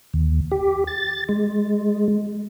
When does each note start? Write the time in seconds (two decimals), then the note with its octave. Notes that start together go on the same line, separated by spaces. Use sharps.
0.13 D#2
0.51 G4
0.87 A6
1.29 G#3